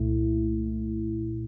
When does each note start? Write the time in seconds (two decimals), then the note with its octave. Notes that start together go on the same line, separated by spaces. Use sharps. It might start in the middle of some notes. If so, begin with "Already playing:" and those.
Already playing: C2 A#2 A3 E4